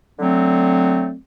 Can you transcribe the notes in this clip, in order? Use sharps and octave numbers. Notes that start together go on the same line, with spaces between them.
D3 F#3 A3 C4